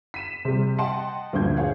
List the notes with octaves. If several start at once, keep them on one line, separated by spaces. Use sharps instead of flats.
B6 D#7 E7
C3 G3
D#5 F#5 G5 A5 C6
D2 G2 A#2 F3 G6 G#6
G#4 C#5 F5 F#5